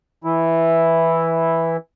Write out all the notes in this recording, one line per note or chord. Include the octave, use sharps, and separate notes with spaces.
E3 E4